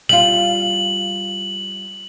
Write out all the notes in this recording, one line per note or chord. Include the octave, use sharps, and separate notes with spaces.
G3 F4 F#7